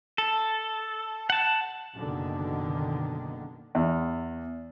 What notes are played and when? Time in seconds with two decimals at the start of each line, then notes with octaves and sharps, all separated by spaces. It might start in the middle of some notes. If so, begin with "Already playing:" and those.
0.18 A4
1.30 F#5 A5
1.96 F#1 B2 D3 D#3
3.75 E2